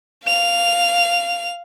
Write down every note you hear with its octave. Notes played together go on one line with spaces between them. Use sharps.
F5 F7